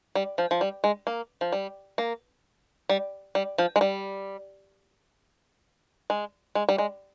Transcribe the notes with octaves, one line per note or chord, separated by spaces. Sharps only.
G3
F3
F3
G3
G#3
A#3
F3
G3
A#3
G3
G3
F3
G#3
G3
G#3
G#3
G3
G#3